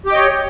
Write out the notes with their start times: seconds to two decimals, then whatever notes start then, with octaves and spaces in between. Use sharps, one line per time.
0.06 G4
0.09 G5
0.12 D#5
0.15 C#5